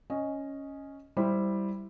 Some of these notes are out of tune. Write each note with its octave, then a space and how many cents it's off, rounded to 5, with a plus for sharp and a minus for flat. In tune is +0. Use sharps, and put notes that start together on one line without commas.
C#4 +0 D#5 +0
G3 +0 E4 +0 C5 +0